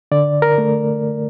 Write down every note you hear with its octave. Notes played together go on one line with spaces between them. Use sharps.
D3 D5
A#4
A3